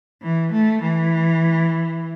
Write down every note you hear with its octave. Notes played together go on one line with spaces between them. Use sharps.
E3
A3
E3